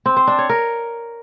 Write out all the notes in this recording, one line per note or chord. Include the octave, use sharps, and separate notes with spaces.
C4
C5
D4
C#5
A#4